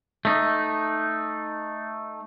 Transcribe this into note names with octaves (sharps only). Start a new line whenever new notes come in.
A3 D#4